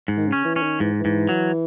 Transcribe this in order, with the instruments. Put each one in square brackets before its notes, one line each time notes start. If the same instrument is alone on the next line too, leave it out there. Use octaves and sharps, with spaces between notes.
[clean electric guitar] G#2
[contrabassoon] D#3
C#3
[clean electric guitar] C#4
[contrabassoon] E3
[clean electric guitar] C#4
[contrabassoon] D#3
[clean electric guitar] G#2 [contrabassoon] E3
[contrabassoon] E3
[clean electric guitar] G#2
F#3